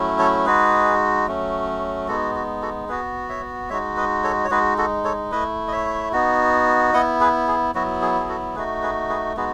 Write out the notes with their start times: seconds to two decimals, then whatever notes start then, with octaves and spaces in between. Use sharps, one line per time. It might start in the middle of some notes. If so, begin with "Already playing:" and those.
Already playing: F#3 A3 C#4 E4
0.19 A4 C#5
0.46 G#3 D#4 F#4 G#4 B4
1.27 F#3 A3 C#4
2.08 G#3 B3 D#4 F#4 A4
2.35 F#4
2.62 F#4 A4
2.89 B3 F#4 G#4 B4
3.29 C#5 E5
3.70 G#3 D#4 F#4 C#5 E5
3.97 B4 D#5
4.24 A4 C#5
4.44 C#5
4.51 G#3 D#4 F#4 G#4 B4
4.78 F#4 A4
5.05 A4 C#5
5.32 A3 E4 B4 D#5
5.68 D#5
5.72 C#5 E5
6.13 B3 D#4 F#4
6.94 B3 E4 D#5 F#5
7.20 G#4 B4
7.48 G#4
7.75 F#3 B3 E4 F#4
8.02 G#4
8.20 G#4
8.28 F#4 A4
8.55 A3 D#4 F#4 G#4 B4
8.83 G#4 B4
9.09 G#4 B4
9.37 G#3 B3 D#4 F#4 G#4 B4